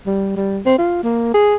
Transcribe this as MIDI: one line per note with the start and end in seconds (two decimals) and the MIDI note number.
0.06 0.32 55
0.36 0.60 55
0.66 0.77 60
0.78 1.02 65
1.03 1.30 58
1.34 1.56 68